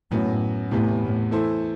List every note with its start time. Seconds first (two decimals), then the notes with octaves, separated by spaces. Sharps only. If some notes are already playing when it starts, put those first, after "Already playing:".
0.11 F#2 A2 F#3 B3
0.71 E2 A2 C3 E3 B3
1.31 E3 A3 E4 A4 C5